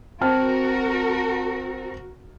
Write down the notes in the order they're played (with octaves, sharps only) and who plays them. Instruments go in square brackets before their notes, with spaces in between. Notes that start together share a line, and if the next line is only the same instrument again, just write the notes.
[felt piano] C4 A5 F6 [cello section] F#4 A#4